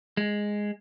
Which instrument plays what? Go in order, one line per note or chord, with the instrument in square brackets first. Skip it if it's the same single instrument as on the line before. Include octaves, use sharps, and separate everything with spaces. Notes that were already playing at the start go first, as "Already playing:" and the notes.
[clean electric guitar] G#3